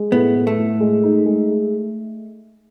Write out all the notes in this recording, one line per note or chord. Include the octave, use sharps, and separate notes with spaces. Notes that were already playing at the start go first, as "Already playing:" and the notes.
Already playing: G#3
A2 B3
A2
A3
A2
G#3
D#4
G#3